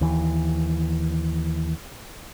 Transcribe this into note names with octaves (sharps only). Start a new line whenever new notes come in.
D#2 E3